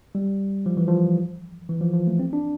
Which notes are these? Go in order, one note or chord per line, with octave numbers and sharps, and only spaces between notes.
G3
F3
E3
F3
E3
F3
F3
A3
C4
D4